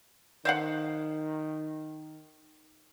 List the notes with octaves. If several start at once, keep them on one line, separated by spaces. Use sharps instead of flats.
D#3 C5 F5 F#5